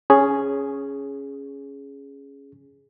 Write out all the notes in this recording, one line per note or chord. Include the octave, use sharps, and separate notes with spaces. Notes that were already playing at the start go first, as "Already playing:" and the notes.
C#4 G#4